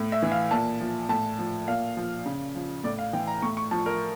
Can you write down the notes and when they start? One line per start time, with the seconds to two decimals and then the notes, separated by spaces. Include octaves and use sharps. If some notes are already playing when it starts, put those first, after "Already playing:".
Already playing: A2
0.12 E5
0.22 E3
0.32 F5
0.51 A#2 A5
0.80 F3
1.09 A2 A5
1.39 F3
1.68 A#2 F5
1.97 F3
2.26 C#3
2.55 F3
2.84 A2 D5
2.99 F5
3.13 E3 G5
3.27 A#5
3.42 A2 C#6
3.57 C#6
3.71 F3 A5
3.86 A#4